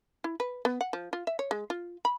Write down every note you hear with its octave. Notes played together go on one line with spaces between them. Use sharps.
E4
B4
B3
F#5
F3
F4
E5
C#5
G#3
F4
B5